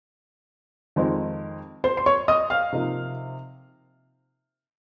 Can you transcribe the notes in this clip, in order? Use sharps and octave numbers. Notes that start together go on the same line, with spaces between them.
F2 D#3 G#3 C4 D#4
C5 C6
C6
C#5 C#6
D#5 D#6
F5 F6
C3 F3 A#3 D#4